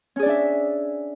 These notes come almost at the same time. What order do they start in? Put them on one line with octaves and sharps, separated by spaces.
C#4 G#4 D5 D4 E5